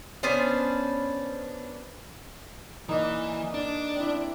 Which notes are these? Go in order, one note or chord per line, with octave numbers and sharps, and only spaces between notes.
B3 C#4 D4 C5
E3 A#3 D#4 D5
D4
C4 E4